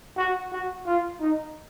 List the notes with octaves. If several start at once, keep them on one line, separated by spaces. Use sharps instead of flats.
F#4
F#4
F4
D#4